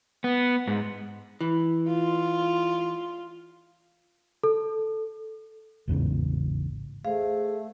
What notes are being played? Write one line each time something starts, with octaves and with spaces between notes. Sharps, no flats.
B3
G#2
E3
F4
A4
A1 E2 G#2 C#3
A3 G#4 C5 F5